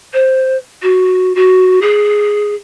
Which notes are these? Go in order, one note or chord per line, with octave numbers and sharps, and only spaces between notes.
C5
F#4
F#4
G#4